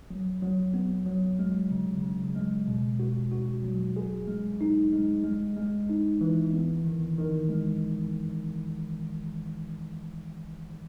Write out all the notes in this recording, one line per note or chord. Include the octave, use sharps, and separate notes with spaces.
F#3
F#3
B3
F#3
G#3
C#3
C#3
G#3
B2
F#4
F#4
F#3
G#4
G#3
D#4
G#3
G#3
G#3
D#4
E3
B3
D#3
D#3
G#3